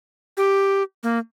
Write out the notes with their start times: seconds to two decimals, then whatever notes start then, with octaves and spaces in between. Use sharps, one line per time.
0.37 G4
1.03 A#3